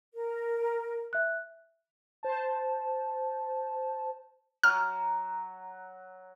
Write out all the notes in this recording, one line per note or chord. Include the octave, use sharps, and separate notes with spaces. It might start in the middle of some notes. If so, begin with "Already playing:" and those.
A#4
E5 F#6
C5 A5
F#3 F6